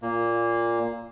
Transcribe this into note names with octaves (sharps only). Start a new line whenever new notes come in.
A#2 A#3